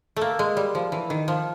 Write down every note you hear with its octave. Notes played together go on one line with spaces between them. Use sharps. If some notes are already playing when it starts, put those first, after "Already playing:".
A3 A#3
G#3
G3
F3
E3
D#3
F3